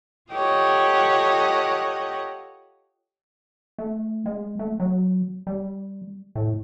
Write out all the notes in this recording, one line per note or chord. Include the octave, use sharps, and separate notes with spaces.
F4 G4 A4 C#5 D#5 F#5
A3
G#3
A3
F#3
G3
A2